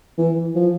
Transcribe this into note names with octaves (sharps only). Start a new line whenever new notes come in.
E3
F3